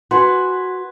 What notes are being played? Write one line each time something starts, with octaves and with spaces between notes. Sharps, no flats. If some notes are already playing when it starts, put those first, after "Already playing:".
F#4 B4 G#5 C6